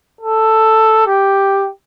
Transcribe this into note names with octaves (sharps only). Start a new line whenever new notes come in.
A4
G4